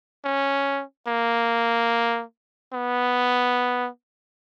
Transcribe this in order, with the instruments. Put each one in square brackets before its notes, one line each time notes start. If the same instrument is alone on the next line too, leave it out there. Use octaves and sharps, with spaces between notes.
[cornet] C#4
A#3
B3